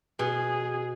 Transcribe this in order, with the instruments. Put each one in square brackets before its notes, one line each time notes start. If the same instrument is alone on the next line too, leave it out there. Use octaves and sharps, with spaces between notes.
[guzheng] B2 [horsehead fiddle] G#4